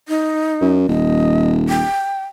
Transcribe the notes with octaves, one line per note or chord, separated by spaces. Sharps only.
D#4
F#2
D#1 D#5
G5